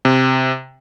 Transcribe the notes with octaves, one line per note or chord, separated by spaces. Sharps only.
C3